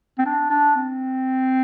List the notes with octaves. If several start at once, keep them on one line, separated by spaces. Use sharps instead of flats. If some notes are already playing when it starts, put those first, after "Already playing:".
C4
D4
D4
C4